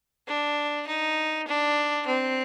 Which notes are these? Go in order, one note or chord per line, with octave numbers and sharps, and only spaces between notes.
D4
D#4
D4
C4